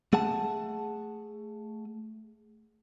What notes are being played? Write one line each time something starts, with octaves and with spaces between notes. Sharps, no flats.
A3 G#4 F#5 A5